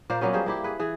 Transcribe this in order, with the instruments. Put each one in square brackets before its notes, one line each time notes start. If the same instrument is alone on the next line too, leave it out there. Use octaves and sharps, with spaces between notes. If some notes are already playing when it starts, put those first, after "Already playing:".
[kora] A#2 A#3 C5 D5
F#3 A#3 B3 C#4
F3 G3 G#4 C5
A#3 E4 G4
G#4 B4
E3 G#4